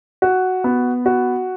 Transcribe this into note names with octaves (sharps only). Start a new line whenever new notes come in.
F#4
B3
F#4